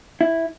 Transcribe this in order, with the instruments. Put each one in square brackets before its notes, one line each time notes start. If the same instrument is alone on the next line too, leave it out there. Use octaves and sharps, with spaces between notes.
[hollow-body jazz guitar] E4